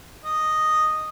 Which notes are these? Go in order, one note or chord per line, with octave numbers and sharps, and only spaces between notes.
D#5